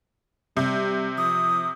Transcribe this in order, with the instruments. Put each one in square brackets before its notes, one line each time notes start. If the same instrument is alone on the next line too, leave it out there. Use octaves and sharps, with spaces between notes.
[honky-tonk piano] C3 [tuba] G3
[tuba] F3 [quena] D#6